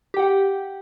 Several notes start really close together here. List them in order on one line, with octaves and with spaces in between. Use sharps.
G4 G5 F#5